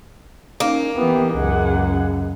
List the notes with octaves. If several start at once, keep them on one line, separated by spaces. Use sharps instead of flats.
A#3 C#4 D#4
E3 B3 E4 G4
C#2 F#2 G#4 F#5